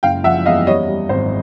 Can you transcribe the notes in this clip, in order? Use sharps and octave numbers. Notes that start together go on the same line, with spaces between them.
F#1 F5 G5
F3 E5 F#5
E2 D#5 F5
G3 C#5 D#5
G3
G#1 C5